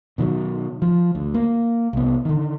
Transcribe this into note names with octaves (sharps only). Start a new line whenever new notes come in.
B2 D#3 E3 F#3
F3
D2
A#3
C2 B3
D3 D#3